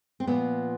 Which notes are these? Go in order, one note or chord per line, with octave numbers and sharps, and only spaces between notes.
C4
A#2 F3 B3